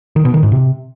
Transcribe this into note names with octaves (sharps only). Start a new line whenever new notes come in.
D#3
B2
D#3
G#2
C3